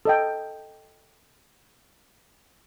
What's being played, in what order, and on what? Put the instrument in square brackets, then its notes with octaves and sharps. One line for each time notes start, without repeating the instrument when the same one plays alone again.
[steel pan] A4 D#5 G5